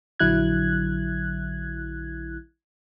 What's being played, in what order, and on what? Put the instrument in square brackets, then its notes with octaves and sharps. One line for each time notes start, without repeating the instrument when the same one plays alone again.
[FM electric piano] A#1 D3 F#3 E4 F#6 G#6